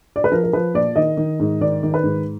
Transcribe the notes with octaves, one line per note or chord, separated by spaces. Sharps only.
D5
B4
F3 A#4
A#4
F3 B4
A#2 D5
D#3 D#5
D#3
G#2
D#3 D5
D#3
B4
G#2